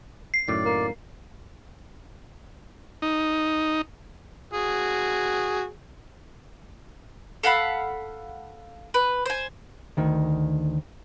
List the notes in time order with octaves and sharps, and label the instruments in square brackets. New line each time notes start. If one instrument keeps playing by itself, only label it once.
[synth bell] C7
[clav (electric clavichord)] F#2 A2 D#3 [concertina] D5
[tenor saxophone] A#3
[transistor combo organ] D#4
[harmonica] F#4 G#4
[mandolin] A4 F5 F#5 B5
B4
C5 G#5
[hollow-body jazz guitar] D2 D#3